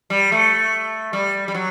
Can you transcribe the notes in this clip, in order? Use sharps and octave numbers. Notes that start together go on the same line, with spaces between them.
G3
A3
G3
G3
F#3